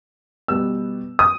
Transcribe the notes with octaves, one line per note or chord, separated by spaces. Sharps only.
B2 G3 B3 E6
D#6